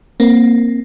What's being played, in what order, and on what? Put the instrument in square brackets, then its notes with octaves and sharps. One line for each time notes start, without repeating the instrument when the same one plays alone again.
[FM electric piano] A#3 C4